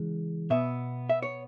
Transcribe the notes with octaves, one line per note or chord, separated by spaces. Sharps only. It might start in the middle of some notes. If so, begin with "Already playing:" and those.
Already playing: C#3 E3 G#3
B2 B3 E5
E5
C#5